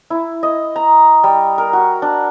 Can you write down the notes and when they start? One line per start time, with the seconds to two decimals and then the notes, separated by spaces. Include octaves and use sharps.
0.10 E4
0.43 D#5
0.76 A#5
1.24 G3
1.58 A#4
1.73 F#4
2.02 D4